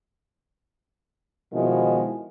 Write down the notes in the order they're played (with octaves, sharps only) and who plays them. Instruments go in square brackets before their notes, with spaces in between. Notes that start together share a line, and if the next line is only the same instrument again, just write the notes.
[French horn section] B2 D#3 F3 G#3 E4